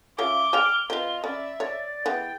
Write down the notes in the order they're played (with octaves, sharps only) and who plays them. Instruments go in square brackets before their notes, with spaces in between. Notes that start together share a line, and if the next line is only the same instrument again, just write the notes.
[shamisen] C#3 F4 C#5 [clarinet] E5 [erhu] D6 [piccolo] G7
[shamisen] G#4 D5 G5 [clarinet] F6
[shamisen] C4 B4 [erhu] F4 [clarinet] D#5
[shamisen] C#4 [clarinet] D5 [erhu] E5 [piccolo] B5
[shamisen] C#5 [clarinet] D5 [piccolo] A6
[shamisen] E3 B3 [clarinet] G#4 [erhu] G5